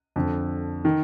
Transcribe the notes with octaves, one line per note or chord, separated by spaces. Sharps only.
F2 D3
D#3